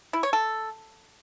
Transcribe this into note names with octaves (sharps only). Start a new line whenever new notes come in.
E4
C#5
A4